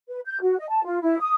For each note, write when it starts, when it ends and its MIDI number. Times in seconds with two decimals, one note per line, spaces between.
0.09 0.20 71
0.26 0.40 91
0.41 0.57 66
0.58 0.69 75
0.70 0.83 81
0.85 0.99 65
1.01 1.18 64
1.20 1.34 87